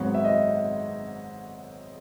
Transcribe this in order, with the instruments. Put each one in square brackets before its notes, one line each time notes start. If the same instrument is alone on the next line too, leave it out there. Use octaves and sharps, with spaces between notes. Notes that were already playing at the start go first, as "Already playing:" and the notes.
Already playing: [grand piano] G#1 G#2 F#3 B3 C#5
E5
D#5